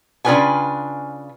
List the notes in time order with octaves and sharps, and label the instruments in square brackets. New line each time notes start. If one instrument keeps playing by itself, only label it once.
[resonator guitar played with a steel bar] C#3 D4 F4 B4 G5 G#5